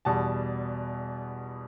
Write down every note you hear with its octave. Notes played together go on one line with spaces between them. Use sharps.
E2 B2 G3 A5